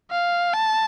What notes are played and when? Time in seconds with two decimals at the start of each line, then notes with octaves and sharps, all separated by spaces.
0.11 F5
0.53 A5